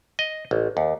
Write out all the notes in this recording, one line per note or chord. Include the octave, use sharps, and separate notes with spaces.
D#5
A1
D#2